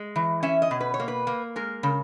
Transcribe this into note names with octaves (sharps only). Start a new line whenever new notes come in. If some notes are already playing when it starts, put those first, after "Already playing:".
Already playing: G#3
E3
C#4 E5
D#5
B2
B4
C#5
A#3
B4
A#3
G#3 A#4
C#3